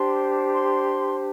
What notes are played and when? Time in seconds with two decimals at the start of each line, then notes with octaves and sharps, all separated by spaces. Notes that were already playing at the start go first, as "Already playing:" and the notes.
Already playing: D4 G4 C5 C6
0.52 C6